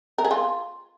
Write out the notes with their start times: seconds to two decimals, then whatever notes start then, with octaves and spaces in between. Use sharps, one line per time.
0.18 A#4
0.25 G#4
0.31 F4